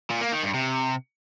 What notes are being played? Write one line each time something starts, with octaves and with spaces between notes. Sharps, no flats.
A#2
A#3
D#3
G2
C3